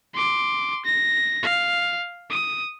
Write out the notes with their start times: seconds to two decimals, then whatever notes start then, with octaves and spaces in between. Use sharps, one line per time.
0.14 C6 D6
0.86 A#6
1.43 F5
2.30 D#6